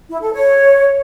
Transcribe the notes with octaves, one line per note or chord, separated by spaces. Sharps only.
E4
A4
C#5